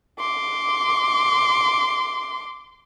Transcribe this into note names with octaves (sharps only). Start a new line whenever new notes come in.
C6 D6